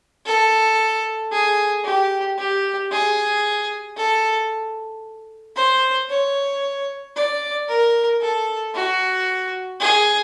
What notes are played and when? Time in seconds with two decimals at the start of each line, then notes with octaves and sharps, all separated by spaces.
0.26 A4
1.32 G#4
1.85 G4
2.38 G4
2.91 G#4
3.97 A4
5.56 C5
6.09 C#5
7.16 D5
7.68 A#4
8.21 A4
8.75 F#4
9.80 G#4